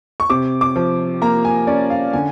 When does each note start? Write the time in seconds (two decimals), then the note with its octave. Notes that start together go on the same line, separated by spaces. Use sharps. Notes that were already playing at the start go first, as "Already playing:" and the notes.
0.20 C#6
0.30 C3 D6
0.61 D6
0.76 F3
1.22 A#3 A#5
1.45 G#5
1.67 C#4 D5
1.90 F5
2.13 D3 G#5